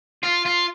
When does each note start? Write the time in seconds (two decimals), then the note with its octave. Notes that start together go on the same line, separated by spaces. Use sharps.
0.23 F4
0.45 F4